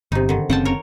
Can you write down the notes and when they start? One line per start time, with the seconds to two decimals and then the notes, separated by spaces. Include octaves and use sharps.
0.12 G1 C3 D#4
0.29 D3 D#3
0.50 F#1 C#3 C4 F#5 G5 A5
0.65 A#4 C#5